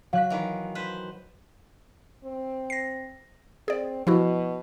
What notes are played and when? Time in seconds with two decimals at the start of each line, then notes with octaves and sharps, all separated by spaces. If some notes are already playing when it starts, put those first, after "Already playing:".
0.13 F#3 F5 F#6 B6
0.30 D#3 E3
0.75 B4 C5
2.24 C4
2.70 A#6 C7
3.68 C4 G#4 D5
4.07 B2 F3 E4 F#4